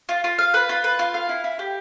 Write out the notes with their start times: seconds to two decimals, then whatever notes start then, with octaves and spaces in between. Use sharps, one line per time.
0.09 F4
0.24 F4
0.39 F5
0.54 B4
0.69 F4
0.84 B4
0.99 F4
1.14 F5
1.29 E4
1.44 E4
1.59 G4